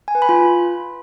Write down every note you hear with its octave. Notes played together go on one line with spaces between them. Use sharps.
G#5
B4
B5
F4